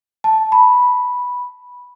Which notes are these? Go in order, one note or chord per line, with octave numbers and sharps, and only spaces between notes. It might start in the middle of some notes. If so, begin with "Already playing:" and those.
A5
B5